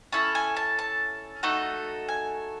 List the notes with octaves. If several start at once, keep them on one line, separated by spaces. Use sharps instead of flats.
C#4 E4 A4 A5
G#5
A5
A5
A3 D#4 F#4 A4
G#5